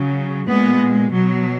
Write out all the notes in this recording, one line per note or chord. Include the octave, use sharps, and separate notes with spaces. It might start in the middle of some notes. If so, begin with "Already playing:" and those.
Already playing: C#3 F#3
A#2 G#3 B3
B2 F#3